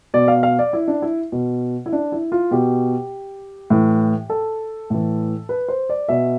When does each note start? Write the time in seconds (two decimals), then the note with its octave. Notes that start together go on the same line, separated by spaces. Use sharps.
0.14 B2 D5
0.28 F5
0.43 F5
0.59 D5
0.73 E4
0.88 D4
1.02 E4
1.32 B2
1.86 E4
1.93 D4
2.12 E4
2.32 F4
2.51 B2 G4
3.70 A2 E3
4.30 A4
4.90 A2 E3
5.49 B4
5.68 C5
5.89 D5
6.09 B2 E5